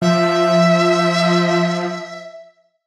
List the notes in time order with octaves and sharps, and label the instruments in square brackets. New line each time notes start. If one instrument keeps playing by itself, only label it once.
[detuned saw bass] F3 [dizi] E5